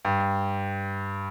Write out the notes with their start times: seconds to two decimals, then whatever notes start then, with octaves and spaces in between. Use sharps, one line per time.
0.05 G2